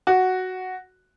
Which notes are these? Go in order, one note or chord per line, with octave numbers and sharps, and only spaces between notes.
F#4